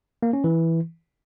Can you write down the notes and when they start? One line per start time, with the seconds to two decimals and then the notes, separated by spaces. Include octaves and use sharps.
0.23 A#3
0.33 C#4
0.44 E3